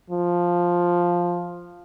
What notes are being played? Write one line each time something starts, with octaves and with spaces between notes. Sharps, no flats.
F3